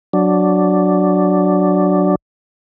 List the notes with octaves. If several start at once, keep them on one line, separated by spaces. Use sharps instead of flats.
F#3 D4